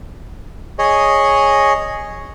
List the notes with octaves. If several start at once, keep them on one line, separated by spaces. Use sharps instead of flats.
G#4 C#5 D#5